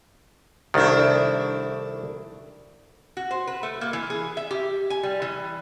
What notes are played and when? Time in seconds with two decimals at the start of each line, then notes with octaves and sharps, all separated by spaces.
0.74 C2 D#3 A3 D4 E4
3.17 F#4
3.31 C5
3.47 B4
3.63 A3
3.81 A#3
3.93 E3
4.10 G#4
4.37 E5
4.51 G4
4.90 G#5
5.03 G3
5.22 E3